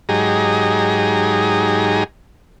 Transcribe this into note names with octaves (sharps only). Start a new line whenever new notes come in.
G#2 F#3 D#4 G4 G#4 A#5